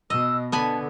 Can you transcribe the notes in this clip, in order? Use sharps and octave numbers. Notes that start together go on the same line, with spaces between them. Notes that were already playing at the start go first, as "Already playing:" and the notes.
B2 D#5 E6
D3 B3 G#5 A5 B5